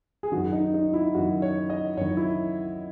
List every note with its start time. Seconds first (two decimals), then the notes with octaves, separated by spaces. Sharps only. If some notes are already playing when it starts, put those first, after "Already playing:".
0.23 G#4
0.32 F#2 D#3 F#4
0.53 D#4
0.74 D#4
0.94 E4
1.15 F#2 D#3 F#4
1.42 C#5
1.70 D#5
1.97 F#2 D#3 C#5
2.17 E4